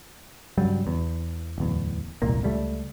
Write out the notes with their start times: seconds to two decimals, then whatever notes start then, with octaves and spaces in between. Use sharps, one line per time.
0.58 G2 C#3 F#3 G3
0.87 E2
1.58 D1 E2
2.22 E1 C2 A#2 A#3
2.43 C#2 G3 A3